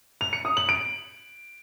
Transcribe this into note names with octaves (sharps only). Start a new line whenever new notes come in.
F7
C#7
D#6
F#7
D7